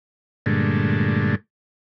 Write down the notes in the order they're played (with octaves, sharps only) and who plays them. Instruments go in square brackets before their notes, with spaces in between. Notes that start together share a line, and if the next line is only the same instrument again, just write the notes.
[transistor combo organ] G2 A#2 D3 G#3 A3